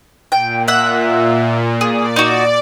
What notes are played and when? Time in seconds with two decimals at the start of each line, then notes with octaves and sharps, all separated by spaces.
0.32 A#2 G5
0.68 E5 F#5
1.81 G#4 D5
2.16 D#4 F#4